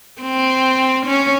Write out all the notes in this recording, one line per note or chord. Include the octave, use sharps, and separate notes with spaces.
C4
C#4